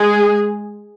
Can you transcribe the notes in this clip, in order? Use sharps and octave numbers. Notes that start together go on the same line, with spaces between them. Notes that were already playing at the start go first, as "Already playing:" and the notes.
Already playing: G#3 G#4